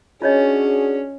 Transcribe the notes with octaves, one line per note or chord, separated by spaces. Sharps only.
C#4 D4 F4 F#4 G#4 C#5 D#5